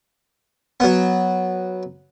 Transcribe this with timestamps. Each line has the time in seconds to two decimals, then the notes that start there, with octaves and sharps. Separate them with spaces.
0.80 F#3 B3